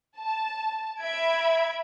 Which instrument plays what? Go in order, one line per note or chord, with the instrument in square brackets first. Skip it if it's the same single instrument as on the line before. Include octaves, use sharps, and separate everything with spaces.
[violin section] A5
E5 B5 G#6 D7